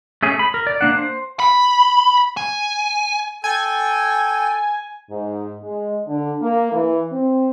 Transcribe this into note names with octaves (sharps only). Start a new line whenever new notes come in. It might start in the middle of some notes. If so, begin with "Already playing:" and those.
A3 C#4 G#4
B5
A#4
D5
A#3 D4 F#5
C5
B5
G#5
A4 G5 G#5
G#2
G#3
D3
A#3
E3
C4